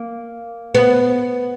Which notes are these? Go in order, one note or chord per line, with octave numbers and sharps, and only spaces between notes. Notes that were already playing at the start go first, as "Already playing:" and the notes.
Already playing: A#3
B3